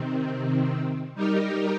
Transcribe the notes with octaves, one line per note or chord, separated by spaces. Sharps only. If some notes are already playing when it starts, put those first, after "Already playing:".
Already playing: C3 D#3 C4
G3 D#4 G4 A#4